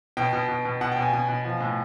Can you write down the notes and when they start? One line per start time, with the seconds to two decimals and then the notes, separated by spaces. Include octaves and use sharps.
0.17 B2 G5
0.33 B2
0.49 B2
0.65 B2
0.81 B2 F#5
0.92 B2 G5
1.02 G#5
1.13 B2 G#5
1.28 B2
1.45 F3
1.61 A2